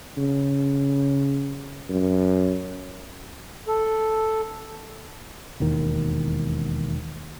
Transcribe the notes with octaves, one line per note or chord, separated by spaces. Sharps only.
C#3
F#2
A4
E1 D#2 D#3